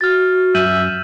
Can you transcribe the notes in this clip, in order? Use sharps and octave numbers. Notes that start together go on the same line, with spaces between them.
F#4 F6 A6
F#2 E5 G6 D#7 F#7